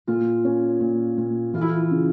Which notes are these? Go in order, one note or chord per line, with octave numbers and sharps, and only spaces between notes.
A#2 F4
C#4
A#2
A#2
E3 F4
E4
F4
C#3